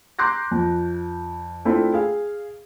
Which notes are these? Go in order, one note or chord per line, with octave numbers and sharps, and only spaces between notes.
A#5 C6 D6 F#6 G6 A#6
F2
A3 C4 D4 E4 F4
G#4 F5